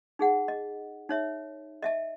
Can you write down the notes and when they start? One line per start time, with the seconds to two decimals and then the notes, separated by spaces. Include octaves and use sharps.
0.19 D#4 G#4 F#5
0.48 D#5
1.09 D#4 C#5 E5
1.82 D#5 E5 A5